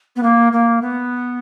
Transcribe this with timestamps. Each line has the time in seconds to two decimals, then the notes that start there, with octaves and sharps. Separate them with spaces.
0.16 B3
0.23 A#3
0.52 A#3
0.81 B3